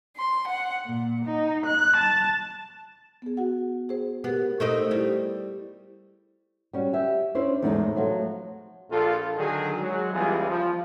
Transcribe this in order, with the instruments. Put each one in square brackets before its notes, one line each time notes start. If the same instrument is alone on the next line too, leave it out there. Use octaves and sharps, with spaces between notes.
[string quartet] C6
F#5
A#2
D#4
F#6
A5
[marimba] B3 G#4
F#4 F#5
G#4 C5
[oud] B3 [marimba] G4 A#4
[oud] A3 C4 D#4
[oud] G3 [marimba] E4 G4
[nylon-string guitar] G3 C#4 F#4
G4 E5 G#5
C#4 D4 E4 C5 D5
E2 A2 G#3 A3 C#4 D#4
F3 F#3 A3 F4
[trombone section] A#1 F4 A4
D3 D#3 F#3 G#4
F#3 G#3
C#2 E3 G3 B3 F4 G#4
F3